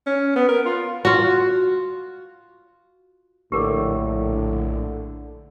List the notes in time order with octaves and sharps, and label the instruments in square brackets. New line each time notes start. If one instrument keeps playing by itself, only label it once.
[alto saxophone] C#4
B3
A#4
F4
[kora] F4 F#4
[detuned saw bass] A#1 [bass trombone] A2 [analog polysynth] D3 [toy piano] G4 A#4 D6